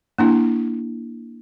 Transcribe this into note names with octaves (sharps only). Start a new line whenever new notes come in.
A#3 D4 E4